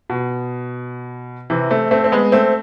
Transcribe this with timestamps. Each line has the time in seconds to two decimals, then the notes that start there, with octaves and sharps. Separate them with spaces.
0.10 B2
1.50 C3 E3
1.71 A3 C4
1.91 A3 C4
2.04 C4
2.12 G#3 B3
2.32 A3 C4